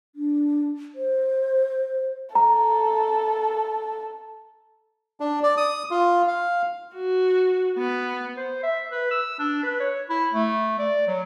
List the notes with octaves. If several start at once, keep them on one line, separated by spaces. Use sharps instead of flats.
D4
C5
A4 A#5
D4
D5
D#6
F4
F5
F#4
B3
C5
E5
B4
E6
D4
B4
C#5
E4
A3
D5
F#3